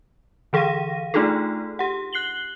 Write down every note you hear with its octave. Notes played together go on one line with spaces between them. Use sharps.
D3 E3 G#4 F5 A#6 D#7
A3 D4 D#4 F4 G#4 A4
G4 F#5
F#6 C7 F#7 G7